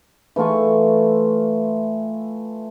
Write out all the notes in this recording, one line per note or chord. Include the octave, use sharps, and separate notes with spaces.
E3 A3 F4 C#6